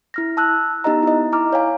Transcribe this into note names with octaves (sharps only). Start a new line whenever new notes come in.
E4 F6 A#6
A5 E6 F#6
B3 D#4 G4 D#5 A#5
E4 D#5
E4 A#5 D6 F6
C#5 F5 G#5